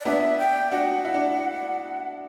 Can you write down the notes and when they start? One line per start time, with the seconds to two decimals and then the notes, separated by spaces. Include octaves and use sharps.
0.01 D5
0.05 B3 D4 E5
0.38 G5
0.71 D4 F#4 F#5
1.05 E4
1.14 D4